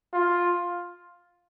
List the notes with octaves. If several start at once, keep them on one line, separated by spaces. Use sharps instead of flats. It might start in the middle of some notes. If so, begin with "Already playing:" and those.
F4